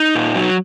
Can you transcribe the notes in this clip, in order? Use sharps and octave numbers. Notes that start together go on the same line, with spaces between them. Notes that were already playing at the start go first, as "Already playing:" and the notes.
Already playing: D#4
A#2
F#3